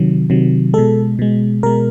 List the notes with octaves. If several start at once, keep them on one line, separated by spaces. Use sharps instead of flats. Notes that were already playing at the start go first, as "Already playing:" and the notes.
Already playing: C3 D#3 F#3
C3 D#3 F#3
B2 G#3 A4
B2 G#3
B2 G#3 A#4